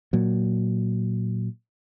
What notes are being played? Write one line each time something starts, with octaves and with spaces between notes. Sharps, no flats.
A#2 F#3